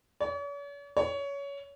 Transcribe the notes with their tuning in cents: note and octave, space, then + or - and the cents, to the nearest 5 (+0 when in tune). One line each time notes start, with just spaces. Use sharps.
C#5 +45
C#5 +20